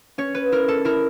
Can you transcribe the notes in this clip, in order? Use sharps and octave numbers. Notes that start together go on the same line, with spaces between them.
C#4 C#5
B4
E4 A#4
A4
E4 A#4